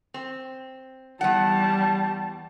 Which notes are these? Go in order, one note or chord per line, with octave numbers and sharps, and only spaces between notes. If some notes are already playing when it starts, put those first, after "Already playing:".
C4
E2 G3 F#5 A5